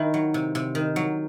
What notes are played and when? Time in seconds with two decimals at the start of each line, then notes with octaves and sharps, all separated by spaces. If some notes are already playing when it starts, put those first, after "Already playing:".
Already playing: D#3 E4
0.14 F#3
0.34 C3
0.55 C3
0.75 D#3
0.96 F#3